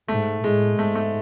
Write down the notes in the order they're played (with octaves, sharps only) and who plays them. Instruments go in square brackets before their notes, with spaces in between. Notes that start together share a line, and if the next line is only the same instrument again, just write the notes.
[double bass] G#2 [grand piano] A3
[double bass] A2 [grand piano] G#3
[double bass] G#2 [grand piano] A3
[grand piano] A3